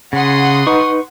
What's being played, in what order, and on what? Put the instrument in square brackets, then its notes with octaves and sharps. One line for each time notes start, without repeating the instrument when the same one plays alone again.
[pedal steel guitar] C#3 [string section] F#5 C6 D#6
[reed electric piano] D#4 B4 [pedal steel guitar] C#6